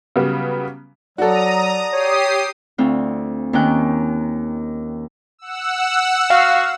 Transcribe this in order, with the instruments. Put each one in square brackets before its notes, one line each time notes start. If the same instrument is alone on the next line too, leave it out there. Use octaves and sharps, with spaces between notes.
[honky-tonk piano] C#3 F#3 G3 B3
[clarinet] F#3 [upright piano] F#4 A4 [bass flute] D5 [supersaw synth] A#5 D#6
[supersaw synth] G4 D#6 C7 [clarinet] C#5
[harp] D2 C4 F4
D#2 D#3 C#4 G5 F#6
[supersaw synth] F#5 E6
[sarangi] F#4 [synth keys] F5